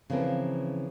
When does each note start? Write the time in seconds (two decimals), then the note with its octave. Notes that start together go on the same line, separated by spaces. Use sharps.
0.10 C#3 E3 F3 C4 A#4